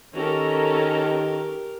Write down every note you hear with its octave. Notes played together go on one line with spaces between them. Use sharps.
D#3 C#4 G4 A4 A#4 A#5